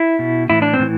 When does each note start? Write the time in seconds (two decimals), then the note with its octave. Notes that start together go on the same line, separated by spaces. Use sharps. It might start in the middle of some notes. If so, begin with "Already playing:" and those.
Already playing: E4
0.19 B2
0.50 A2 E3 E4
0.62 D4
0.74 C4
0.79 A2 E3